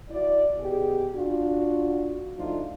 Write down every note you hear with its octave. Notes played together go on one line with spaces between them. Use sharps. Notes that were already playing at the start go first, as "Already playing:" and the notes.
E4 F#4 D5
B2 G4 G#4
D4 F4 F#4
F3 A3 D4 D#4 F4